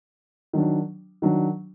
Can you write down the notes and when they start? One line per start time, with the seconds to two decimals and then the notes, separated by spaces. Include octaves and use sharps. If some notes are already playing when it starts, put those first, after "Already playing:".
0.53 D#3 F#3 D4
1.22 D#3 F#3 D4